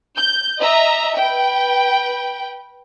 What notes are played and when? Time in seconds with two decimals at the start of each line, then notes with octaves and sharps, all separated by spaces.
0.18 G6
0.59 D#5 E5 A#5
1.16 B4 G5